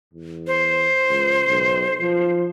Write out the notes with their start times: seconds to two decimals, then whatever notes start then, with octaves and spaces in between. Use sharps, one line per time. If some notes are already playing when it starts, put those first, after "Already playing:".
0.13 E2
0.47 C5
1.09 C#2
1.48 B1
2.00 F3